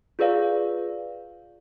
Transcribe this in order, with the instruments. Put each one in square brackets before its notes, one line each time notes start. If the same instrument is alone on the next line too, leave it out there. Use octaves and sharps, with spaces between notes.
[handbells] F4 G#4 B4 D5 F5